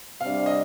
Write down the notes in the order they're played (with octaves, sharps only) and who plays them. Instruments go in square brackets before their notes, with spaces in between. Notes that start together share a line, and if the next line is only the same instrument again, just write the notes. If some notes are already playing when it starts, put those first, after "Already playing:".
[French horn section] C3 G3 D4 [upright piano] F5
[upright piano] D#5